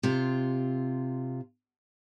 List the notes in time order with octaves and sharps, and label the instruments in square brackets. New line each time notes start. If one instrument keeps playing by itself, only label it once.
[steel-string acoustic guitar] C3 F4